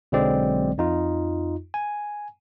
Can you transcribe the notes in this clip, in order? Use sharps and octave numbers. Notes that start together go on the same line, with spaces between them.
B1 D3 F#3 G#3 C4 D5
F2 D#4 F4
G#5